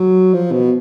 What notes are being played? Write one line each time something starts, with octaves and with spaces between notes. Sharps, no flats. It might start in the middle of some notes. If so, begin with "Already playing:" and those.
Already playing: F#3
F3
B2